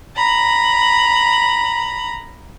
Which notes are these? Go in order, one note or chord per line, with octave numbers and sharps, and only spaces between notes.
A#5 B5